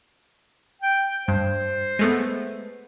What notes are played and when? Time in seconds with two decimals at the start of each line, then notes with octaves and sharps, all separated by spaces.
0.82 G5
1.28 G2 C5
1.99 G#3 A3 B3